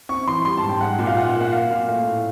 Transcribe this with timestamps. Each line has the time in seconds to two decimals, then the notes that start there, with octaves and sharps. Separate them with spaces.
0.09 C4 C#6
0.27 E3 C6
0.45 G3 C6
0.57 A5
0.63 G#2
0.69 G5
0.81 G#3 F#5
0.99 A#2
1.07 F5
1.17 F4 F#5
1.29 F#5
1.35 A#3
1.41 F#5
1.53 A#3 F5
1.70 A#2
1.88 A3 F5
2.07 A2